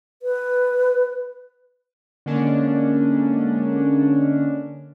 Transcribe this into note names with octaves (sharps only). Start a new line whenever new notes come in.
B4
D3 G#3 A#3 C#4 D4